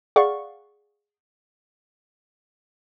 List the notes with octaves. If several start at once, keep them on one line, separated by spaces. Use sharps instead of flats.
G#4 D5 F5 F#5 C#6